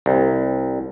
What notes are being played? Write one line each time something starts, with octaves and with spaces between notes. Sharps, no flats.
C2